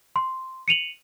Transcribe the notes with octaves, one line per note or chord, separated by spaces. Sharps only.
C6
C#7 D#7 F7 F#7